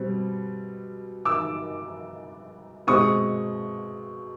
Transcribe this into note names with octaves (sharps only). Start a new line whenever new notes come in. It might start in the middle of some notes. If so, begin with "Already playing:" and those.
Already playing: B2 G3 C4
D6 E6
B2 G#3 C4 C#6 D#6